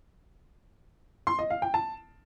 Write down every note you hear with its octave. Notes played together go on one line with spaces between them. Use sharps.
C6
D#5
F5
G5
A5